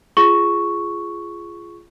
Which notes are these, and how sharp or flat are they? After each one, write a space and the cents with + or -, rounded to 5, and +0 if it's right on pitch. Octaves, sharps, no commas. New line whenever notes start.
F4 -20 G#4 +0 C#6 +5